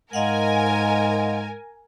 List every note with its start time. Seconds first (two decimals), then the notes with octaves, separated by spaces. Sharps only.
0.13 G#2 G#3 A#4 D#5 F5 F#5 G#5